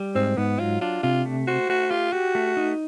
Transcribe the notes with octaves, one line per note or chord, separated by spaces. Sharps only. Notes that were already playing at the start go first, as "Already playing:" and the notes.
Already playing: G3
G#2 C4
G#2 B3
F#3 F4
D4 F4
C3 F4
A3
F#4 C5
A3 F#4
F4 G4
F#4 G4
A3
D#4